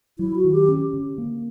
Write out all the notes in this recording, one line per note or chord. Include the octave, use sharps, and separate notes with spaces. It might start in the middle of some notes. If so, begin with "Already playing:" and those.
F#3 E4
F#4
D#3
G4
C#4
D3
A#3